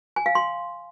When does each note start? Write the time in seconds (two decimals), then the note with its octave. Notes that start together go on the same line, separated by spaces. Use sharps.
0.16 G#5
0.26 F5
0.35 C6